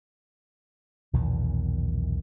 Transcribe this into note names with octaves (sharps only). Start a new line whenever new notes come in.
B1 E2 A#2 D#3